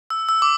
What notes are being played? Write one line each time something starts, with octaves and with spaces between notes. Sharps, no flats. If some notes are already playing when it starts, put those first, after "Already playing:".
E6
E6
D6